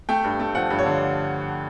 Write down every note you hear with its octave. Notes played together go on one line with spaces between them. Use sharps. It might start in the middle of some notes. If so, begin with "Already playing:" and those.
A3 G5
G2
A3
F3 F#5
G2
C#5
D3